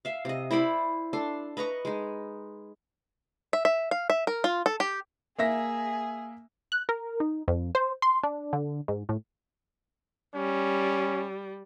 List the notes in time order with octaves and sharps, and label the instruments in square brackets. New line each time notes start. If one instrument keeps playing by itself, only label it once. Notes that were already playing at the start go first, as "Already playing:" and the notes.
[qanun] E5 F5
C3 D#5
E4 C5 D5 B5
D4 A4 C6
B4 D#5 A#5 C#6
G#3 D#4
[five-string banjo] E5
E5
F5
E5
A#4
F4
A4
G4
[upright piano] A#3 E5 A#6 [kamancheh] G#4
[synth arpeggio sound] F#6
A#4
D#4
F2
C5
C6
D4
D3
G#2
A2
[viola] G3 [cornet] C#4